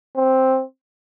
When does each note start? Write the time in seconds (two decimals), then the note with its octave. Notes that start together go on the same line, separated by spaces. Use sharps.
0.16 C4